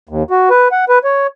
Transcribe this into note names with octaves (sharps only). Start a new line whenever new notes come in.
D#2
F#4
B4
F#5
B4
C#5